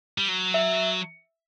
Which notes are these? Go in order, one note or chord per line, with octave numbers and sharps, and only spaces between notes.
G3
F#3
E5